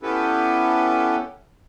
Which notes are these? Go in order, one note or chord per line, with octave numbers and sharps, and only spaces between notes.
B3 C#4 E4 G4 A4 B4